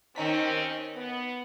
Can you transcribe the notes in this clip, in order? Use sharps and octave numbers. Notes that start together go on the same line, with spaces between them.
D#2 D#3 C4 C#4 D#4 B6
B3